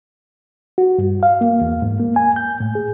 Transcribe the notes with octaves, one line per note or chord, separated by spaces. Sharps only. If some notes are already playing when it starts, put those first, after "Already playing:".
F#4
G2
F5
A#3
E2
G#2
A#3
G#5
G6
A2
G#4